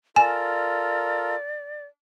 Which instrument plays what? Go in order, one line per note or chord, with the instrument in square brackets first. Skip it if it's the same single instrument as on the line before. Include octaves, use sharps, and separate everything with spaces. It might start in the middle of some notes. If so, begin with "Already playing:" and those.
[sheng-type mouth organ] F4 A4 A#4 [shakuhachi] D5 [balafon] G#5